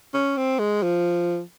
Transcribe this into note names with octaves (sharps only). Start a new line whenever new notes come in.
C#4
C4
G#3
F3